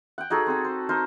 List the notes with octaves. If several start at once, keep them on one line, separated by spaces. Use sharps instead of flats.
F#5 G5
D#4 F#4 G#4 A4
C4 A4
C5
D#4 A#4 C5